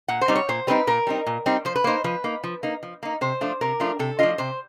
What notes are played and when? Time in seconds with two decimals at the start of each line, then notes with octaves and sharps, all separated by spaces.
0.08 A#2 F#5
0.21 C5
0.28 G3 C4 D#4
0.36 C#5
0.49 A#2 C5
0.67 G3 C4 D#4 B4
0.87 A#2 A#4
1.07 G3 C4 D#4
1.27 A#2
1.46 G3 C4 D#4
1.65 F3 C5
1.76 B4
1.84 A#3 D#4 C5
2.04 F3 B4
2.24 A#3 D#4
2.44 F3
2.63 A#3 D#4
2.83 F3
3.03 A#3 D#4
3.21 C3 C5
3.41 F3 A3 D4 F4
3.61 C3 A#4
3.80 F3 A3 D4 F4
3.99 C3 A4
4.19 F3 A3 D4 F4 D#5
4.38 C3 C5